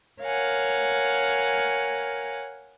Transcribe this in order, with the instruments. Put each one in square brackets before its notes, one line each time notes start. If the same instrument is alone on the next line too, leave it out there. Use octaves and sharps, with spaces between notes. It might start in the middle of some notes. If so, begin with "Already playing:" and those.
[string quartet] A#4 C#5 F5 F#5 G#5